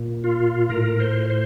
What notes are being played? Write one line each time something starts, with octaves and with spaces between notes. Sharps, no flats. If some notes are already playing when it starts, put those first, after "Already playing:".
Already playing: A#2
F4
A2 A#4
C5
C5